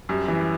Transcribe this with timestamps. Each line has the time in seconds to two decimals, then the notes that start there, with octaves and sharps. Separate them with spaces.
0.09 F#2 G3
0.28 E3